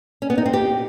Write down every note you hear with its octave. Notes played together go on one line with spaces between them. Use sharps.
C#4
B3
D#4
C4
G4